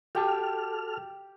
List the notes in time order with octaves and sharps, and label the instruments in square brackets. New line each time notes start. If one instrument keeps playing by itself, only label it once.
[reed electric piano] F#4 G5 A5 [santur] G4 [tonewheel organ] A4 F6